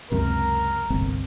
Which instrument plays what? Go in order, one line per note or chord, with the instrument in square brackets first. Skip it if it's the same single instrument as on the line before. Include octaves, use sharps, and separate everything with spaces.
[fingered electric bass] C#2 F#2 C3 [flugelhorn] A#4
[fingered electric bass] G1 C2 C4